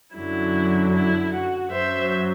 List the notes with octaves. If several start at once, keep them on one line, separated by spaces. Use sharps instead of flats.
F#2 D3 F#3 E4
E4
F#4
F#2 F#3 C5 E5